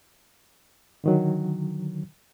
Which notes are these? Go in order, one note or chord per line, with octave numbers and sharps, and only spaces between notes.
D3 D#3 F#3